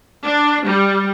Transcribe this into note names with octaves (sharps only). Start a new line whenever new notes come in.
D4
G3